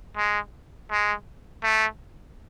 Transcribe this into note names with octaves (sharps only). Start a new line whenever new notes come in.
G#3
G#3
A3